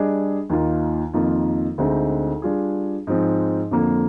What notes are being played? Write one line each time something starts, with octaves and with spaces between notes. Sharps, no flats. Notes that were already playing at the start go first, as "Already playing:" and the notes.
Already playing: G3 D4 G#4 D#5
D#2 D#3 A#3 F4
F2 D#3 A#3 F4
D2 D3 G#3 C4 D#4
G3 D4 F4 G#4
G#2 F3 C4
F2 D3 F3 A#3